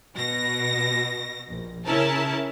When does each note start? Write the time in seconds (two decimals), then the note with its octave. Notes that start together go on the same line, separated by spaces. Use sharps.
0.15 B2 A#6
1.48 A#1
1.86 C#3 C#4 E4 A#4 A5